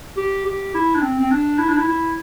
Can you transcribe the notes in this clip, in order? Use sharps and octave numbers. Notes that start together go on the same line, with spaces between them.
G4
G4
E4
D4
C4
C4
D4
E4
D4
E4
E4